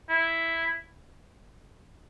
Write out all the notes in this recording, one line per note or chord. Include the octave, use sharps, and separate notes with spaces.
E4